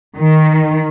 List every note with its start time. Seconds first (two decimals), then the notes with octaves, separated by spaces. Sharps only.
0.18 D#3